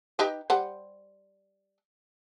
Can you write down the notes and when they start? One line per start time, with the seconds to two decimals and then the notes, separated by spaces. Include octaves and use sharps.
0.19 D#4 G4 B4
0.50 G3 C5 F#5